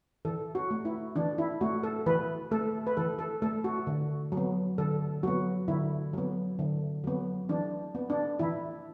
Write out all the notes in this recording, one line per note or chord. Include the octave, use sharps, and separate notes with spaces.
E3 A4
F#4
A3
E4
E3 D4
E4
A3 F#4
A4
E3 B4
A3 A4
B4
E3 A4
A4
A3 A4
F#4
D3
F#3
B3
D3 A4
F#3 B3 F#4
D3 E4
F#3 B3
D3
F#3 B3
E3 D4
B3
D4
E3 E4